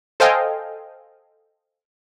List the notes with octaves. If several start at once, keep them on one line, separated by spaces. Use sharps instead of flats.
A4 C5 D#5 F5 G5 G#5